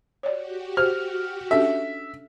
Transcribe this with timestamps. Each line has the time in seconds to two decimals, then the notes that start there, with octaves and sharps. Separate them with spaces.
0.23 F#4 G4 C#5 D5
0.77 C5 F6
1.51 C#4 D4 A4 E5